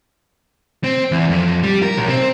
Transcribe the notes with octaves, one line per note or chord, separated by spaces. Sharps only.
C4
E2
F2
G3
A#4
B1
C4